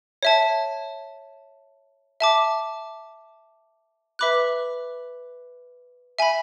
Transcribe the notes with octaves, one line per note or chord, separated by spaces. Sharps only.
C#5 E5 A5
E5 A5 D6
B4 E5 B5 D6 F#6
E5 G#5 B5